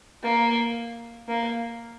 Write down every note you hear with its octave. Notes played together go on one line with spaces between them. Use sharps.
A#3
A#3